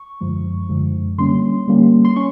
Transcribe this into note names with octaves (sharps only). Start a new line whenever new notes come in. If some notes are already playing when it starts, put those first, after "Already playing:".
Already playing: C#6
F#2 D3 F3 G#3
F#2 D3 F3 G#3
D3 G3 A#3 C#4 C6
D3 G3 A#3 C#4
C6
C#4 C#6